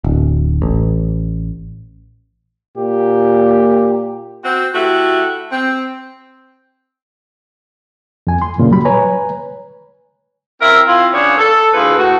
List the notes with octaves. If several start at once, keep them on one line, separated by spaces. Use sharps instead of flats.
D1
A1
A#2 G4
C4 F#4
A3 E4 F#4 G4
C4
F2 G#5
C6
F#2 A#2 C#3
F#3 G3 B5
B4 C#5 G#5 A#5
C4 E4 A#4 E5
C4 E4 F4
C#3 B3 D4 C#5
A4
D2 E4 F4 G#4 B4
A2 F#4